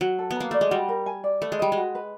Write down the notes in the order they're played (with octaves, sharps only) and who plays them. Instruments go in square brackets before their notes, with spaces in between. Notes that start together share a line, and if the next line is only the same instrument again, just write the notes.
[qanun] F#3 [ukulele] F#4
[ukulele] A4
[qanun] B3 [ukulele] A#5
[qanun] A#3
[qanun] A3 [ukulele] D5
[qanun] G#3
[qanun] G3 [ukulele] F#4
[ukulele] A#4
G#5
D5
[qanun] A3 [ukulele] B4
[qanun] G#3
[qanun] G3 [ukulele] D#5
[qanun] G#3
[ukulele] F#4
B4